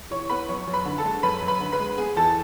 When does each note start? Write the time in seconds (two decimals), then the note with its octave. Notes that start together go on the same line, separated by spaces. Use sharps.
0.11 E3 C#5 C#6
0.30 B3 B4 B5
0.48 F#2 C#5 C#6
0.67 F#2
0.73 B4 B5
0.86 D3
0.98 A4 A5
1.05 G#3
1.23 F#2 B4 B5
1.42 F#2
1.48 B4 B5
1.60 D3
1.72 B4 B5
1.80 G#3
1.98 B3 G#4 G#5
2.16 E2 A4 A5